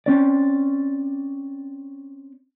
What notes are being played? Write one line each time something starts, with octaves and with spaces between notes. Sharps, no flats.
C4 C#4 D5